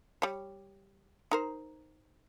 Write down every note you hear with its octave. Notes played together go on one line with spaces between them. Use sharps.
G3 C#5
D#4 A#4 C5